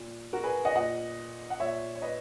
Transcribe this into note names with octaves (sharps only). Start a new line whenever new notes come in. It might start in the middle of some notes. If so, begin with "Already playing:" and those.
Already playing: A#2
F#4 A#4
G#4 B4
D#5 F#5
A#2 D#5 F#5
F#5
A#2 C#5 E5
C#5
B4 D#5